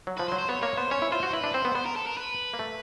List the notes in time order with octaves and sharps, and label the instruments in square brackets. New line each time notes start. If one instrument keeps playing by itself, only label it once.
[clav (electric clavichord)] F#3
[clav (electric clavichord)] F3 [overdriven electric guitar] B4
[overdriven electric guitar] C5
[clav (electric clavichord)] F#3
[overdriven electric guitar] C5
[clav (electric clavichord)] B3 [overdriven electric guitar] C#5
[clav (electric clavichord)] A#3 [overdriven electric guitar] C#5
[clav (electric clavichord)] B3 [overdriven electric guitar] C5
[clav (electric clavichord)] C#4 [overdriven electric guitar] C#5
[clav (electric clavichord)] E4
[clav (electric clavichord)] F4 [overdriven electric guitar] C5
[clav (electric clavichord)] F#4
[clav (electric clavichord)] E4 [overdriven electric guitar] B4
[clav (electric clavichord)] D4
[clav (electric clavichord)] C4 [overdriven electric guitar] C5
[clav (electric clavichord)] B3
[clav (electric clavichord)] B3 [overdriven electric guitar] C5
[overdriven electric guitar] A#4
A4
A#4
B4
[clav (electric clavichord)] A#3
A3